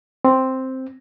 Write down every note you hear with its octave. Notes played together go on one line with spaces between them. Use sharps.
C4